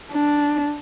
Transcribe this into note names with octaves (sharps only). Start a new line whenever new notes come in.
D4